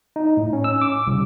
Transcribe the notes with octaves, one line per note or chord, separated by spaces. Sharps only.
D#4
A2
C#4
E6
D6
C2